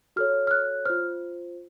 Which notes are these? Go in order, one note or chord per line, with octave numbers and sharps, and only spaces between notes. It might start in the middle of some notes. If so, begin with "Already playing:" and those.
F#4 A4 C#5 F6
F6
F#6
F4 C5 F6